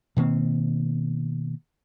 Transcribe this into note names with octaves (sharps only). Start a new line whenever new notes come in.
B2 D#3 A#3 C4